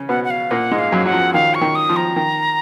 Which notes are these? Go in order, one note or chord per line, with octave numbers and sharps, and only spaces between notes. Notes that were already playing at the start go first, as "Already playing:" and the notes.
Already playing: C#3 C#4
B2 B3 F#5
F#5
F5
A#2 A#3 F#5
G#2 G#3
F5
F#2 F#3
F#3 F#5
F3
D#3 F5
C#6
D#3
D#6
F3
A#5
D#3